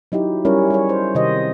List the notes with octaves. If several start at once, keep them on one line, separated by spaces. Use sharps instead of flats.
F#3 D#4 E4 G4
G3 C#4 E4 A#4 C#5
G3 G#4 C#5
C5
C3 D#3 G4 C5 D#5